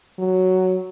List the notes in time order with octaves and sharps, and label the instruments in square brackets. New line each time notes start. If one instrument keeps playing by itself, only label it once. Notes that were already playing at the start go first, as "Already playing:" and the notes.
[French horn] F#3